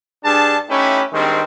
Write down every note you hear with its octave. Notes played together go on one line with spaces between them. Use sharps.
G2 D4 G#4 A5
A3 C#4 D#4 E4 G4 B4
G2 D#3 G#3 C4